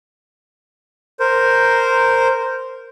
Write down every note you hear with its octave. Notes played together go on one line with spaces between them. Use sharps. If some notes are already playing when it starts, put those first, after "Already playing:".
A#4 C5